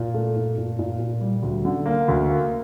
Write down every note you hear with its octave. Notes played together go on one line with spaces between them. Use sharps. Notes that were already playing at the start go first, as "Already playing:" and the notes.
Already playing: A#2
A3
A#2
A#2
A#2
A#2
G3
D2
D3
A#3
D2
A#3